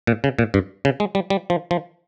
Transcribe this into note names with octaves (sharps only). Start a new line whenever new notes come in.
A#2
C#3
A#2
G2
C#3
G#3
G3
G3
F3
F3